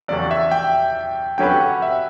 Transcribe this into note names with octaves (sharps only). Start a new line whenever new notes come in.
E2 C#3 F#3 C#4 G4 D5
E5
G5
D3 F#3 C#4 G4 B4 G5
F#5
E5